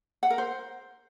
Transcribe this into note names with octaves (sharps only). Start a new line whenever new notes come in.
F#5
A#4
C5